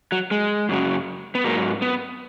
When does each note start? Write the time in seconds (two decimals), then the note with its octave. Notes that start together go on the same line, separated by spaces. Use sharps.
0.12 F#3
0.31 G#3
0.69 F#2 C#3 F#3
1.35 B3
1.44 G#2 F#3 A#3
1.82 B3